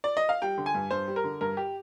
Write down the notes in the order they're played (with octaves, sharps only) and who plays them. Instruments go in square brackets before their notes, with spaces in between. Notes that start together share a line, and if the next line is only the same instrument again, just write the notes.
[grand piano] D5
D#5
F5
G3 G5
D3
G#5
G2
G2 C5
G3
A#4
D3
G2 A#4
G4